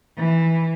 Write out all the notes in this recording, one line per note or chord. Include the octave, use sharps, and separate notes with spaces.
E3